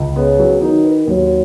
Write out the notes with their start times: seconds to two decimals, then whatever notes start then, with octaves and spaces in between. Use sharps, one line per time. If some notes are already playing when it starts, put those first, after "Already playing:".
Already playing: C#2
0.16 C#3 B3
0.39 F#3
0.62 D#3 D#4
0.84 B4
1.07 D#2 F#3